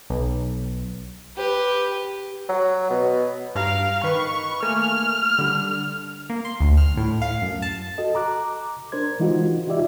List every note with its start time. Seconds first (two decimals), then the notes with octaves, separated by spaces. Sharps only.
0.10 B1
1.36 G4 B4
2.49 F#3
2.90 B2
3.55 G2 F5 A#5 D7
4.03 D#3 B4 B5 C#6
4.63 A3 A#3 G#5 F6
5.38 D3 G3
6.30 A#3
6.45 C6
6.60 D2
6.77 F6
6.97 A2
7.22 F5
7.42 F#2
7.62 A5
7.98 F#4 A4 D#5
8.15 A#5 D6 F#6
8.92 D4 A#4 C5 G#6
9.20 E3 G#3 D#4 F4 F#4
9.67 D#4 F4 G4 D5 E5